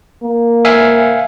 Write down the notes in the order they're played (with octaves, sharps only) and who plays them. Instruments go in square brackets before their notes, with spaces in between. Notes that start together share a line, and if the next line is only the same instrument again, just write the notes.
[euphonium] A#3
[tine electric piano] E5 F5 G#5